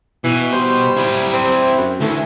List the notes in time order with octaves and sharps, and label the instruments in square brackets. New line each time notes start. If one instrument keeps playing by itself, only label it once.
[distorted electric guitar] B2 [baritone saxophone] E3
[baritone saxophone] G3 [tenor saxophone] C5
[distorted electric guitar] E4 D5
[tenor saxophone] C4
[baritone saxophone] F#2
[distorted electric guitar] D2 [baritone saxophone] E3 [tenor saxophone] A3